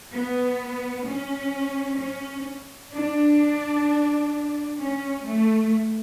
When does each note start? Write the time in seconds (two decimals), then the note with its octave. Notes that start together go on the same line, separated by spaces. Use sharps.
0.13 B3
1.06 C#4
2.00 C#4
2.93 D4
4.80 C#4
5.28 A3